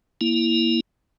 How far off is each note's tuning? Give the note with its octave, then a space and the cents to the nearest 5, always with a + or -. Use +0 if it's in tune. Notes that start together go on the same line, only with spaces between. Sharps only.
A#3 +15 E4 +0